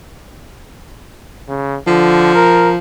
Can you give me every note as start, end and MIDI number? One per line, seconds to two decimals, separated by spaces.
1.48 1.78 49
1.87 2.34 50
1.87 2.78 53
2.35 2.70 70